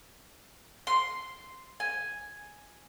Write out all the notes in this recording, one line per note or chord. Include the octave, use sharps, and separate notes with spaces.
C6
G#5